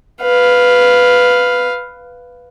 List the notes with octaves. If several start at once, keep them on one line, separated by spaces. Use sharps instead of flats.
B4 F5